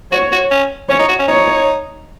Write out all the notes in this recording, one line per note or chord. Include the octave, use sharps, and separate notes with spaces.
F#4 C#5
F#4
C#4
C#4 C#5
D#4
F#4
C#4
D#4 C#5